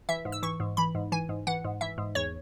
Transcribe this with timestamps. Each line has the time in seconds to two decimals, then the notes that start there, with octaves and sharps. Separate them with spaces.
0.09 E3 E5
0.25 G#2
0.32 E6
0.43 E3 C#6
0.60 G#2
0.77 E3 B5
0.95 G#2
1.12 E3 G#5
1.29 G#2
1.47 E3 F#5
1.64 G#2
1.81 E3 E5
1.98 G#2
2.15 E2 C#5